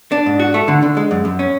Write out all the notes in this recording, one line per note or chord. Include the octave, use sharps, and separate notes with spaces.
D4
G#2
F#4
A3
D3
D3
G#3
F#2
F#2
C#4